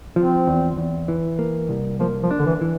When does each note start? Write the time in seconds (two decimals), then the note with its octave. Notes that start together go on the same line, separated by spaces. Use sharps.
0.16 F3 C4
0.47 E2
0.77 E2
1.08 E3
1.39 A#3
1.69 C2
2.00 F3 A#3
2.23 F3
2.31 D4
2.39 D3
2.46 E3
2.61 E3